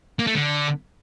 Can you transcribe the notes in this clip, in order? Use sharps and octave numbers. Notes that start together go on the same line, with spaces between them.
A#3
A3
D3